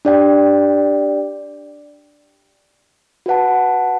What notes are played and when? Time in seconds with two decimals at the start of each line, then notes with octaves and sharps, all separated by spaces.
0.05 D4 G4 D5 G5
3.26 F#4 B4 F#5 A5